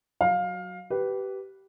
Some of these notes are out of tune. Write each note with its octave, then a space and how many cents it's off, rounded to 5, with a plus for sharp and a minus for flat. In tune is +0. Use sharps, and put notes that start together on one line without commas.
F#3 +0 F5 +20
G4 -20 B4 +0